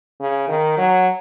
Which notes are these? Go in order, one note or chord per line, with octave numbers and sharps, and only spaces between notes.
C#3
D#3
F#3